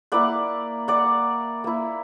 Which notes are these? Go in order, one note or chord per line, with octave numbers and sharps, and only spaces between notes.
A#3 E4 D5 F#5
D5 F#5
A#3 E4